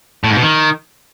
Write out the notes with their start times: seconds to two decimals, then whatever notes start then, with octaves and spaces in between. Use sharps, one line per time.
0.24 A2
0.30 G#2
0.36 B2
0.42 D#3